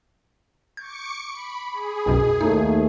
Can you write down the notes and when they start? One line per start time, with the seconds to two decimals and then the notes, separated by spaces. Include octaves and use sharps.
0.77 C#6 D6 G6 C#7
1.30 B5
1.71 G#4
2.06 B1 F#2 B2
2.41 D#2 A3 D#4